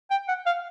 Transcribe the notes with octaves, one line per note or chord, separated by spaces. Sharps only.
G5
F#5
F5